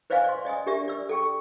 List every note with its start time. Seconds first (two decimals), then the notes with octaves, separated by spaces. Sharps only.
0.10 B4 C5 D5 D#5 F5 G#5
0.24 D5 C6
0.45 D5 D#5 G#5 D#6
0.66 D4 G4 A#4 D5 E5
0.88 D5 E6
1.09 A4 G5 C#6